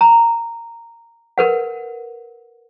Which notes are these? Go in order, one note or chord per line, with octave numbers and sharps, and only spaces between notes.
A#5
A#4 B4 F#5